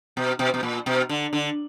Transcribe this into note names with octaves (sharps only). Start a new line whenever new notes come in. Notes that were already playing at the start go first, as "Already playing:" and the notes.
B2
B2
B2
A#2
B2
D3
D3